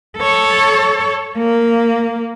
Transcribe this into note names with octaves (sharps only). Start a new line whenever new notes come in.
A4 C#5
A#3